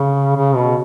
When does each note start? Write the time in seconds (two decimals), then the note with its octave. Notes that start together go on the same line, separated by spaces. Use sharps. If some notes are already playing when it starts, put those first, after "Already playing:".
Already playing: C#3
0.37 C#3
0.55 B2